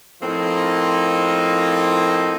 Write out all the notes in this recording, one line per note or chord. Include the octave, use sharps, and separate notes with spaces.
A2 F3 A#3 C4 D#4 F4